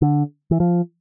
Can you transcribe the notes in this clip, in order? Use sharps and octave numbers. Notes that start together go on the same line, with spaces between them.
D3
E3
F3